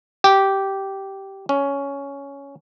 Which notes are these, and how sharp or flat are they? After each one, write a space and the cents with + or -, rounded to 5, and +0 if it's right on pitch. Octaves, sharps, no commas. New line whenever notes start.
G4 -10
C#4 +10